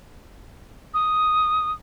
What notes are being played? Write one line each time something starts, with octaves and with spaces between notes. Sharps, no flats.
D#6